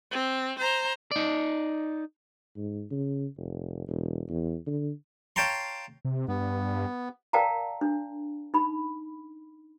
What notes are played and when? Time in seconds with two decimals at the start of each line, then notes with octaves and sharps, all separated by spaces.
0.11 C4
0.59 C5 A#5
1.11 D#4 D5
2.56 G#2
2.91 C#3
3.37 F1
3.88 E1
4.29 E2
4.66 D3
5.36 C#5 F5 G5 A5 A#5 C6
6.05 C3
6.28 G2 B3
7.33 A#4 D5 F5 G5 A5 A#5
7.81 D4
8.54 D#4 B5